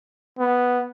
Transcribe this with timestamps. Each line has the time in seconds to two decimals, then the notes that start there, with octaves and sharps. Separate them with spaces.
0.39 B3